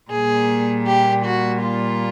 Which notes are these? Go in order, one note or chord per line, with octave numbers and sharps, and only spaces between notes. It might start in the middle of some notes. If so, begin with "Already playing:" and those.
A#2 G3 A#3 G#4
G4
F#4
F4